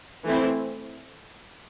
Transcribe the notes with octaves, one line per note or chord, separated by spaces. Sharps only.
E3 A3 C4 E4